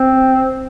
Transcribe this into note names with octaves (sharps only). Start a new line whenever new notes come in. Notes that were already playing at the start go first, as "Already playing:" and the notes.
Already playing: C4